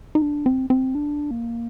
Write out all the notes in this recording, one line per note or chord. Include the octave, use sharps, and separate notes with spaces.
D#4
D4
C4
C4
D4
A#3